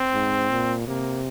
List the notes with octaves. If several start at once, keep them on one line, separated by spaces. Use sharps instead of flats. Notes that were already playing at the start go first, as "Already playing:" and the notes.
Already playing: C4
G#2
A#2
C3 A#3